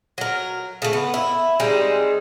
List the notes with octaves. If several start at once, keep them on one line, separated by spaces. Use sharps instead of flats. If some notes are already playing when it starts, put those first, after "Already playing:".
F#3 A#4
C#3 A3
B3
E4
G3 G#3 C4 D#4